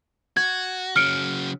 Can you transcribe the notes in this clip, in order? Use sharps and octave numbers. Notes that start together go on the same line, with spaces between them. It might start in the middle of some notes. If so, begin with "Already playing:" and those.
F#4 G#6
C#3 F#3 F6 C#7 D7